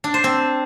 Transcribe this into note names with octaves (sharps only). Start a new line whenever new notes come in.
D4
C5
C4